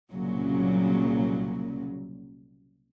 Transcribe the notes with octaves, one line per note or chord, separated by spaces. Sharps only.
C2 A#2 C#3 F#3